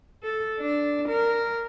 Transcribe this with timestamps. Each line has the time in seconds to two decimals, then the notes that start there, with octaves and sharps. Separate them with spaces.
0.23 A4
0.60 D4
1.09 A#4